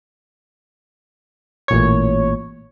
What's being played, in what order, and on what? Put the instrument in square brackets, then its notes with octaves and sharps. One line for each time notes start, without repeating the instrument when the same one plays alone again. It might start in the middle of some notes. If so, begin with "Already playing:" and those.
[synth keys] A1 A#2 C#5